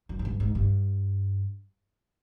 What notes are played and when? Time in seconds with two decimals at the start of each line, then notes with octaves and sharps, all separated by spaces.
0.09 F#2
0.19 G#2
0.25 G2
0.40 G#2
0.55 G2